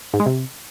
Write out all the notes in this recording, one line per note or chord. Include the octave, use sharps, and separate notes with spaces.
G#2
G#3
C3